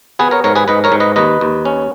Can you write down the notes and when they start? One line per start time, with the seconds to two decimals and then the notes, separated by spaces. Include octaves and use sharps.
0.19 B3 G#4 B4
0.31 A#4 C#5
0.44 G#2 A#4 C#5
0.56 G#4 B4
0.68 G#2 B4 D#5
0.84 A#4 C#5
0.92 G#2
1.00 B4 D#5
1.16 D#2 B4 D#5
1.41 D#2
1.65 C#4